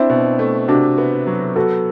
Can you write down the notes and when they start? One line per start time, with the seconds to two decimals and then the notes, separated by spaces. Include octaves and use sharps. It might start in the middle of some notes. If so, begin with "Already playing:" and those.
Already playing: C4 D4 E4
0.10 B2
0.39 A3
0.68 C3 D4 F#4
0.98 B3
1.27 F#3
1.56 B3 F#4 A4